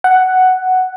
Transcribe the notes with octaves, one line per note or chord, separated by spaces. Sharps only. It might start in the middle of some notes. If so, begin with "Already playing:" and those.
F#5